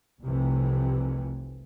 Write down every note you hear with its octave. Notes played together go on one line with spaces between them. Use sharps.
F1 C2 F2 C3 E3